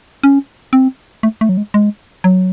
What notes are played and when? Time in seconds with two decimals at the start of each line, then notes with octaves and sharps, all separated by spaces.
0.23 C#4
0.73 C4
1.23 A3
1.41 A3
1.49 F#3
1.57 G#3
1.74 G#3
2.24 F#3